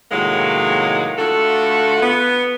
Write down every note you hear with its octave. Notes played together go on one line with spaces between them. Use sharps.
A2 C3 D#3 F#3 G#3 A#3
D3 A3 F4 F#4 A4
B3